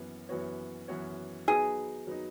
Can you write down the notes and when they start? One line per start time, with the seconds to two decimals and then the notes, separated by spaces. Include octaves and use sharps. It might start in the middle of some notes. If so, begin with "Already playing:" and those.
Already playing: F#2 E3 B3 F#4 C#5
0.29 F#2 E3 B3 F#4 C#5
0.88 F#2 E3 B3 F#4 C#5
1.48 F#3 B3 D#4 G#4
2.07 F#3 B3 D#4